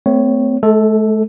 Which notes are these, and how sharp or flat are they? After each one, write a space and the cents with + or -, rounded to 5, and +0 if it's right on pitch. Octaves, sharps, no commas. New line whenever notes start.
A3 +15 C4 -30 C#5 +0
A3 -45 A4 +0